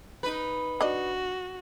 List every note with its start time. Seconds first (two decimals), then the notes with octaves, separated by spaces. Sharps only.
0.23 D#4 B4
0.81 D4 F#4 D#5